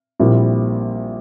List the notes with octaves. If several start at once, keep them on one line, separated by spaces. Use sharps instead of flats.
A#1 A#2 G3 C4 E4